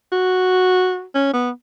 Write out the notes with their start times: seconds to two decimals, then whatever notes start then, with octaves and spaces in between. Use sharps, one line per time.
0.12 F#4
1.14 C#4
1.33 B3